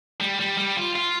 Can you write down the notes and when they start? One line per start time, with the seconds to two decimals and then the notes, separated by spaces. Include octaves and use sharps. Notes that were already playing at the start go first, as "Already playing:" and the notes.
0.21 G3
0.39 G3
0.58 G3
0.77 F4
0.95 F4